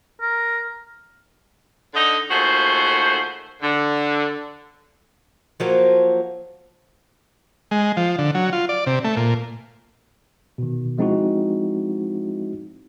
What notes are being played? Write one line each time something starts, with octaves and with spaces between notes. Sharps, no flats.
A#4
D3 D#4 D#5
D#2 A3 F4 F#4 G#4 C5
D3
F3 F#3 A#3
G#3
F3
D3
F#3
F4
D5
C3
A3
A#2
B2 D#3
F3 G#3 C4 D#4 E4 F#4